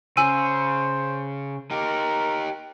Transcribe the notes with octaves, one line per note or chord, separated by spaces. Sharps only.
C#3 C5 G#5 E6 D#7
D#4 G4 A#4